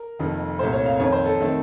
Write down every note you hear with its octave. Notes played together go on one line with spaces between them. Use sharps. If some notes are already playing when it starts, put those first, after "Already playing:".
Already playing: A#4
F1 F2 D#3 A#3
C2 A#2 A3 C4 C5
C#5
F5
F2 D#3 A#3 C#5
C5
A4
D#3 A3 C4